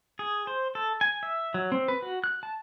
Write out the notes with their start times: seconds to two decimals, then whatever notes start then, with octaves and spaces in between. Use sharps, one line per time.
0.19 G#4
0.47 C5
0.75 A4
1.01 G#5
1.23 E5
1.54 F#3
1.72 C4
1.88 B4
2.02 F#4
2.24 F#6
2.43 A5